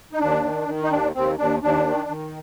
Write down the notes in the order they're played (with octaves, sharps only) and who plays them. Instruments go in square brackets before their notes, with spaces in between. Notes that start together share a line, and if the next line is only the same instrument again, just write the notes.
[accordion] D#4
D#2 D4
D#3
D#3
D#4
D#2 D4
D#2 C4
D#2 D4
D#2 D4
D#3
D#3